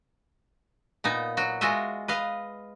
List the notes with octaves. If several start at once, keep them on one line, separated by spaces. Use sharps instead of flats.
A#2 B3 D#4
F#3 F#4
G#3 F4 F#4 D#5 E5
B4 D#5 F5